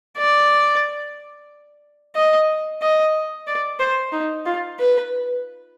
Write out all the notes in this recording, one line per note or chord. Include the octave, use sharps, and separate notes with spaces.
D5
D#5
D#5
D5
C5
D#4
F4
B4